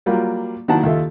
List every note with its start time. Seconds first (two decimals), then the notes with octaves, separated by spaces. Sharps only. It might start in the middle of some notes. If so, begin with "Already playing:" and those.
0.06 F#3 G3 A#3 F4 G4
0.68 D#3 F#3 A#3 E4 F#5 A5
0.83 D#2 F4 A4 E5